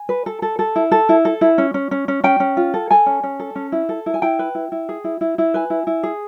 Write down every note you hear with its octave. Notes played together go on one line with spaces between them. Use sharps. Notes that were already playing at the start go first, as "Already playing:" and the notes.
Already playing: G#5
B4
A4
A4
A4
E4
A4
E4
A4
E4
C#4
C#4
C#4
C#4
C#4 G5
C#4
F4
A4
A4 G#5
C#4
C#4
A4
C#4
E4
A4
E4
G#5
E4 G5
B4
E4
E4
G#4
E4
E4
E4
B4 G#5
E4
E4
G#4